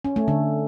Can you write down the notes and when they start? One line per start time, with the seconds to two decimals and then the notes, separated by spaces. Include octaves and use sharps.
0.05 C#4
0.16 A3
0.28 D3